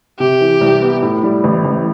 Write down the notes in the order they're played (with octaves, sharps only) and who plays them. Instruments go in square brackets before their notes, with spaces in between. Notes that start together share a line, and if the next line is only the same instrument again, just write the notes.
[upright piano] C3 [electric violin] G4
[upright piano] E3
C2
B3
A2
G3
A1
A1